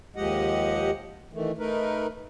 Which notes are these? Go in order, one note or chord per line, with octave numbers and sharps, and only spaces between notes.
D#2 F3 G#3 G4 D#5 F#5
D#3 E3 A3
A3 D#4 A#4 B4